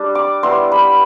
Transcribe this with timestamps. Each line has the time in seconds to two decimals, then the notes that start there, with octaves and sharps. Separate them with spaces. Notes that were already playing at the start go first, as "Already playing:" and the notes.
Already playing: G3 D4
0.15 D6
0.43 G3 B3 E4 C6
0.72 B5